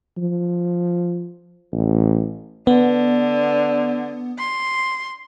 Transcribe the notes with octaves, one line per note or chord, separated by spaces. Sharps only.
F3
A1
D3 B3
C6